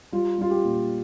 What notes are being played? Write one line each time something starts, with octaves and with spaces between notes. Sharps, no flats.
G3 F4
G3 F4
G4
A#2